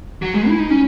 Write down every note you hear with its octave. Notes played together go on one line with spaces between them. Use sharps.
F#3
G#3
E4
D#4
C#4